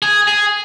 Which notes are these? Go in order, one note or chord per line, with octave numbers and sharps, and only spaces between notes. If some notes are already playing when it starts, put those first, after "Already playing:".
G#4
G#4